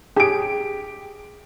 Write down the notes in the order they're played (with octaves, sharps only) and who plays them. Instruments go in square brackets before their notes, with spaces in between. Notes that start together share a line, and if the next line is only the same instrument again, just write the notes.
[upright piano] G4 D7 [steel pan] G#4